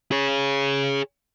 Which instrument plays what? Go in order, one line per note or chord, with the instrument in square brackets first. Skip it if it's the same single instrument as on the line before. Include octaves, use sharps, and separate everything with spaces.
[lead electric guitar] G#4 C#5